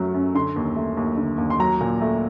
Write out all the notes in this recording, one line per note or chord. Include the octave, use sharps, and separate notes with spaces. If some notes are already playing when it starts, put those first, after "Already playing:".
Already playing: F#2 F#3 A3
F#2
D3 C6
D#2
A3
D#2
D3
D#2
C6
F#3 A#5
A#2
A3